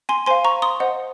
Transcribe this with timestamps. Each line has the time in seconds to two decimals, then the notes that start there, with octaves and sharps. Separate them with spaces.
0.09 G#5 C6
0.26 C5 F5 G#5 C6
0.45 A#5 C#6
0.62 C6 D#6
0.80 C5 D#5 F#5